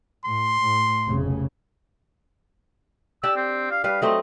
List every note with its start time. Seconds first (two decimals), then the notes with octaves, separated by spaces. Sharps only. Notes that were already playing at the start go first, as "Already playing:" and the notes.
0.25 A2 C6
0.60 A2
1.08 F1 B1 C#3
3.23 D4 G4 D5 E6
3.36 C4
3.71 F5
3.84 G3 B4 F5
4.02 F#3 A3 C4 D#5